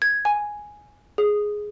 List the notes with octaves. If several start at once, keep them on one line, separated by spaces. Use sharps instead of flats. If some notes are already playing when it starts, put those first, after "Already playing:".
G#6
G#5
G#4